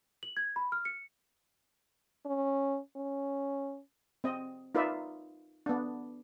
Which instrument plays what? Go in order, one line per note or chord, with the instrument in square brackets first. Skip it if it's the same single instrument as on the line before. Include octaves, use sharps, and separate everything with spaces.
[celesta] F#7
G#6
B5
F6
C#7
[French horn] C#4
C#4
[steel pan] C4 D#5
D#4 F4 A#4 B4 D5 E5
B3 D4